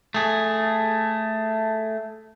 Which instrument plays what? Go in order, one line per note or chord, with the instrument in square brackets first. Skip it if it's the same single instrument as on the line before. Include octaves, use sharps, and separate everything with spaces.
[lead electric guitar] A3 G#4